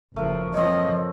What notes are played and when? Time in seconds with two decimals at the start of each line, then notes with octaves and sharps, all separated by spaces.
0.16 F#1 F3 A3 A#4
0.54 F3 C4 C#5 D#5